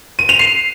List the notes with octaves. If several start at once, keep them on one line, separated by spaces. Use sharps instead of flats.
D#7
F7
C7